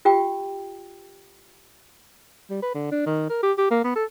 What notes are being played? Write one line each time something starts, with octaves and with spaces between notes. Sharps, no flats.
F4 G4 G5
G3
B4
D3
D4
D#3
A#4
G4
G4
A#3
B3
A4